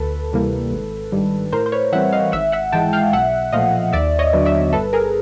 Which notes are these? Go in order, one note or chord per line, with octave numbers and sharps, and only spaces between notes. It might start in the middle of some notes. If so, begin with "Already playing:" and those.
Already playing: D2 A4 B4
C3 E3 G3 A#3
G#1
G2 D#3 G3
A2 A#4 C5
C5
B4 C#5
E3 G3 C4 E5 F#5
D#5 F5
G#1 E5 F#5
E5 F#5
G#2 E3 G#3 G5 A5
F5 G5
B1 E5 F#5
A#2 F3 A3 D#5 F5
D#2 D5 E5
C#5 D#5
D3 F#3 B3 D4
D5 E5
G1 A4 B4
G#4 A#4